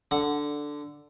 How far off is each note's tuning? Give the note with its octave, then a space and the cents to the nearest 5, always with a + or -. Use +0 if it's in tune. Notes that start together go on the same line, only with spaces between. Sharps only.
D3 +0 F#5 -5